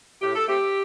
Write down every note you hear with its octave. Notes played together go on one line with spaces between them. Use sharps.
A2 G4
A4
A3 C4 G4